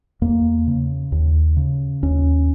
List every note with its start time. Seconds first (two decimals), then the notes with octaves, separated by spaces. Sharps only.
0.21 E2 A#3
0.67 C#3
1.12 D#2
1.57 C#3
2.03 D#2 C#4